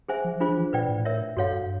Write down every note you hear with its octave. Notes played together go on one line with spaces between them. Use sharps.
G#4 C5 E5 G#5
F3
D4 F4 G#4 C5
F3
E3
A#2 B4 D5 G5
A2
A#4 C#5 E5
G2 F#4 A4 C#5 F5
G2